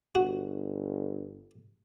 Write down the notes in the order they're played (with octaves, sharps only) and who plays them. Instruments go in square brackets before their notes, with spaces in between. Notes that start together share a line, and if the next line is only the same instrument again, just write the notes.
[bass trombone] G1 [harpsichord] F#4